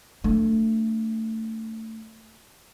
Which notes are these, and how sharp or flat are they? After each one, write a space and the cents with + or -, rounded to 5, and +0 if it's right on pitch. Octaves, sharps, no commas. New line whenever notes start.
A3 +20 D4 +0